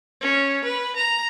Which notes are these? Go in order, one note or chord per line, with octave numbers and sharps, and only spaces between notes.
C#4
B4
A#5